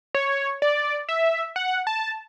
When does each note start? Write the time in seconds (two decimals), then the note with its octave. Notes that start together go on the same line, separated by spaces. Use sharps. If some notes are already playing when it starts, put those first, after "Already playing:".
0.15 C#5
0.62 D5
1.09 E5
1.56 F#5
1.87 A5